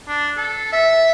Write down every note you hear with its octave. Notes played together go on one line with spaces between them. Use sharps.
D4
A4
E5